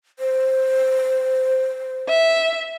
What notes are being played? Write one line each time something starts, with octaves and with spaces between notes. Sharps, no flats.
C5
E5